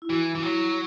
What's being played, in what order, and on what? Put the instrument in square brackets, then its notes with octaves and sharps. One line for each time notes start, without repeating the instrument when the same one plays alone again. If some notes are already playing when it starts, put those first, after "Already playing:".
[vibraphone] E4
[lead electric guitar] E3 [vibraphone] F#4
[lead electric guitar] E3
[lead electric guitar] F#3 [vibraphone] C#5